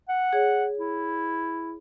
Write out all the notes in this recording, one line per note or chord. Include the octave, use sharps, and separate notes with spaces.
F#5
G#4 C#5
E4